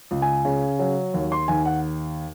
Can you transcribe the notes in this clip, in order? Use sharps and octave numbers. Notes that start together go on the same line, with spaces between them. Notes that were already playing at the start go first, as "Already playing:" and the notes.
C#2
G#5
C#3
F#3
D#2
C6
D#2 G#5
F#5